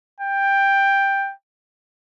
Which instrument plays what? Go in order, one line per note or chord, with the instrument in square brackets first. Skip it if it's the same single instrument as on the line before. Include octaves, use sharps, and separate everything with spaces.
[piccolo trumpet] G5